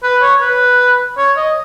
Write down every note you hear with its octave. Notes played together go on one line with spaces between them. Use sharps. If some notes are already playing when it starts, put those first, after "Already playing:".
B4
C#5
B4
C#5
D#5